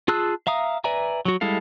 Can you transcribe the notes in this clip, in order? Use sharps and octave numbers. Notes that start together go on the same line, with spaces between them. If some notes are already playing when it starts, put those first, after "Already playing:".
F4 G#4 A5 E6 F#6
E5 F5 A#5 D#6
B4 D5 E5 G#5 A#5
F#3 F#4
G3 G#3 E4 A4 F5